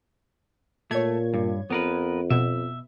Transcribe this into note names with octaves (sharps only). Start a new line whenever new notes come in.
A#2 A3 C#5 G#6
G2
F2 B3 A#4 B4
B2 E5